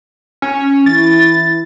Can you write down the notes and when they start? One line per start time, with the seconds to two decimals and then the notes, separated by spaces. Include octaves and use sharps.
0.42 C#4
0.86 E3 E4 A6